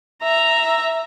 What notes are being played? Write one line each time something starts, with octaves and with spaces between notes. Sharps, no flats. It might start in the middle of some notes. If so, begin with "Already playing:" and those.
E5 A#5